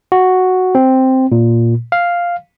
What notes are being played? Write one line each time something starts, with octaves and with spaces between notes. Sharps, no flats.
F#4
C4
A#2
F5